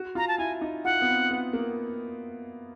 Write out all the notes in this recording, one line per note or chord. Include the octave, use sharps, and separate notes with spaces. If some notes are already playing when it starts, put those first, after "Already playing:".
Already playing: F#4
F4 A#5
A5
E4 G#5
D#4
F4 F#5
B3
C4
B3
A#3